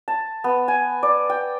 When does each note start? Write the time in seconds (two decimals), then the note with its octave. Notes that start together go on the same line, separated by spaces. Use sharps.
0.08 A5
0.44 B3
0.68 G#5
1.03 D5
1.30 G5